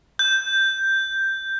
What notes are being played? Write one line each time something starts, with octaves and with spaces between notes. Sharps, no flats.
G6